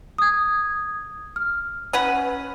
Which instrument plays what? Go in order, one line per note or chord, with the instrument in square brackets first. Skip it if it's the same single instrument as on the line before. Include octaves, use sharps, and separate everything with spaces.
[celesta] D#6 G#6
F6
[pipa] C#4 B4 F#5